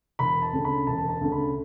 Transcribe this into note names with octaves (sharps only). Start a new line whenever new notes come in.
E1 B5
A5
D2 C#3
B5
E1 A5
A5
D2 C#3
B5